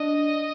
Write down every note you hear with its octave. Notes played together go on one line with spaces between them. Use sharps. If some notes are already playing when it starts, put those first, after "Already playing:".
Already playing: D4 D#5